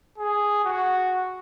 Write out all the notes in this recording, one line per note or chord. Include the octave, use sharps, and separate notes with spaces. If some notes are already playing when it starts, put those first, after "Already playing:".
G#4
F#4